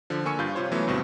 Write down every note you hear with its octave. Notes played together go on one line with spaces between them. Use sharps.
D3 F3
D3 A#3 G#5 C#6 E6 C#7
G2 F4 G6
C3 F4 C5 C#5
E3 F#3 A3 B3 C#4 E4
D2 G2 B2 C4